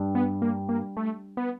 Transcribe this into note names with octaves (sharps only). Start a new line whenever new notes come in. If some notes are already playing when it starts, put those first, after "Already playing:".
Already playing: G2
B3
A#3
A#3
A3
B3